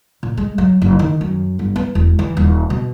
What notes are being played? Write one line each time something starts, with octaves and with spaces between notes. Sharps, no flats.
A#2
G#3
F#3
F#1
D#3
F#2
G1
B3
E1
E3
D#1
B2